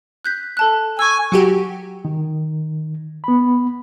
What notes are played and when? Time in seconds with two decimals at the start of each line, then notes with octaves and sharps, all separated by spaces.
0.25 F#6 G6 B6
0.57 A4 A5 F#6
0.99 G#5 C#6 E6
1.32 F#3 F#4 G4
2.05 D#3
3.24 B3 B5